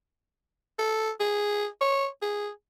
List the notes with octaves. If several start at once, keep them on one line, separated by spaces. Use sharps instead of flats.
A4
G#4
C#5
G#4